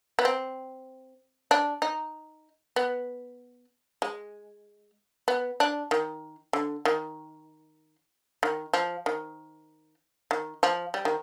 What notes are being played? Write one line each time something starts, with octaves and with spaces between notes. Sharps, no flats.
B3
C4
D4
D#4
B3
G#3
B3
D4
D#3
D3
D#3
D#3
F3
D#3
D#3
F3
G3
D#3